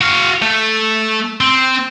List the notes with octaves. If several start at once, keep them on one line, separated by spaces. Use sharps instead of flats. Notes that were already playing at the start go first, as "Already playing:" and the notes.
F#4 F5
A3
C4